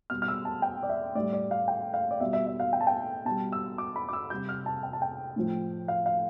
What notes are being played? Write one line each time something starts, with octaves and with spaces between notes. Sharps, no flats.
B2 G3 F6
F6
E6
A5
G5
D5
E5
A2 G3 D5
D5
F5
G5
F5
D5
B2 G3 E5
E5
E5
F5
G5
A5
G5
B2 G3 A5
E6
D6
B5
D6
E6
C3 G3 G6
F6
A5
G5
A5
G5
A2 F3
F5
F5